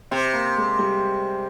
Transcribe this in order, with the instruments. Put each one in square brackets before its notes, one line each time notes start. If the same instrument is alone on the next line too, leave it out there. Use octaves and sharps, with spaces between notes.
[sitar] C3 [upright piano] C4
[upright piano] A#3
G#3
G3